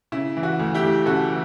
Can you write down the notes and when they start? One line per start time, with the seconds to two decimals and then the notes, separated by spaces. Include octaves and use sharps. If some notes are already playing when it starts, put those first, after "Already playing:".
0.12 C#3 E4
0.37 E3
0.43 F#4
0.59 D2
0.75 E4 G4
0.83 D2
1.06 C#3 F#4 A4
1.29 E3